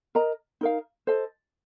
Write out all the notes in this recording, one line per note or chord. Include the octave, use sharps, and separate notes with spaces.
A#4 D#5 A#5
D#4 A#4 F5
A4 C5 D#5